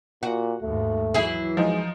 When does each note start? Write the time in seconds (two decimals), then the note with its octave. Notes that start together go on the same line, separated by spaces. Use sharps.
0.23 A#2 F#4
0.62 D#2 G#2 A3
1.14 E3 F#3 E4 G#4
1.57 F3 G#3 D#4